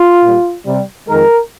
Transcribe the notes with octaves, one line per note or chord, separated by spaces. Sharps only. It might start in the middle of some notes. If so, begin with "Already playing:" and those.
Already playing: F4
A#2 G3
C3 G3
F2 D#3 G#3 A#4